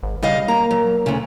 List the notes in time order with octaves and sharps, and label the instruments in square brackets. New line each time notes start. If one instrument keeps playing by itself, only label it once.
[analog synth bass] G#1
[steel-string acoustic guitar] C#3 D#5 F5 [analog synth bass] G3
[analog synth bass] A#3 [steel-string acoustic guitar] A#5
[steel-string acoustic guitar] F#3
D2 C#3